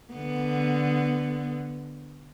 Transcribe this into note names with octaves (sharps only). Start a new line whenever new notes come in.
D3 B3